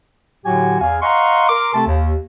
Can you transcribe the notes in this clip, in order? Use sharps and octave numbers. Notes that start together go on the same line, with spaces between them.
A2 D3 F#3 F#4 G4 G#5
E2 F5 G#5
D#5 F5 F#5 A#5 C6 C#6
A#4 C6 D6
C3 A3 C4 A4 A5
D#2